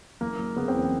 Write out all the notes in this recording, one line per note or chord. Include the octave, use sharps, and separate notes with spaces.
F#1 A#3
F#1
C#3 B3
C4
E2